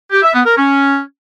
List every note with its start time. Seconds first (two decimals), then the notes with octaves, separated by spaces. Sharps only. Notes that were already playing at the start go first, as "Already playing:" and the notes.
0.12 G4
0.23 E5
0.34 B3
0.45 A#4
0.56 C#4